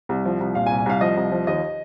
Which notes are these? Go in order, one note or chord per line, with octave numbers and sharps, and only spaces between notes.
C2
F3
C2
A#2 F5
G#5
C2
G#5
C2 F5
F3 D#5
C2
F3
D#2 D#5